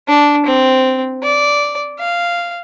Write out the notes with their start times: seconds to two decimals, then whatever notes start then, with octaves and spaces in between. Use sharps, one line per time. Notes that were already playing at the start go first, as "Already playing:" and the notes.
0.08 D4
0.46 C4
1.23 D5
2.00 F5